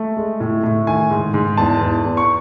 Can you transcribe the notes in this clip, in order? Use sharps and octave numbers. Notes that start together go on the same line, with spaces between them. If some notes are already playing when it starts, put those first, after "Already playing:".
Already playing: A3
G#3
A2
A2
D#3 G#5
G#2
G#2
E2 A5
E2
E2
C#6